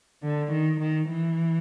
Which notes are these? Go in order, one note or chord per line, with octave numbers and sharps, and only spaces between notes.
D3
D#3
D#3
E3